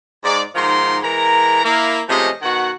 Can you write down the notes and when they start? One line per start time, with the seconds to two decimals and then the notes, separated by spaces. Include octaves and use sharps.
0.24 G#2 D5
0.55 G#2 D#3 F3 A#5 C6
1.03 E3 G#3 A#4 A#5
1.64 A#3 E4
2.08 C3 F3 G#3 A3 C#4 D#5
2.42 B2 D#3 F#4 F#5